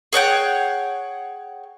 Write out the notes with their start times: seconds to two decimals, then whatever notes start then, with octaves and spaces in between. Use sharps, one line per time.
0.13 G#4 C#5 F#5 G5